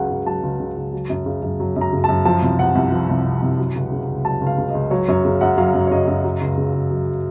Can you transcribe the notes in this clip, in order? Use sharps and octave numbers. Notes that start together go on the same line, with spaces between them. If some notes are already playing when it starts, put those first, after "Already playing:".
Already playing: C#2 C#3 F#3 F#5
C#2
F#3 A5
C#2
C#3
C#2
F#3
F#2
C#3
F#2
F#3
F#2
A#5
C#3
F#2 A5
F3 A5
C2
C3 F#5
C2
F3
C2
C3
C2
F#3
C#2
C#3
C#2
F#3 A5
C#2
F5
C#3
C#2 D#5
F#3 C#5
F#2 C#5
C#3
F#2 F#5
F#3 F5
F#2
C#5
C#3 D#5
F#2
F#3
C#2
C#3
C#2
F#3